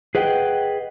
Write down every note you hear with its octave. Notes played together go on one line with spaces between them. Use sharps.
G#4 B4 D#5 F#5 G5